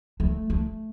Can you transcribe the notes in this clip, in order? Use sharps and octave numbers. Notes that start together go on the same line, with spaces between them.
A3
A3